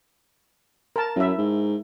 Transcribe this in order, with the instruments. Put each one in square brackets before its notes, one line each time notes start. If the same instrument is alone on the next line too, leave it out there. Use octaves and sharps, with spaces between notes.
[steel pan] A#4 A5
[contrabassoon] F#2 [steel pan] E4 E5
[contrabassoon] G#2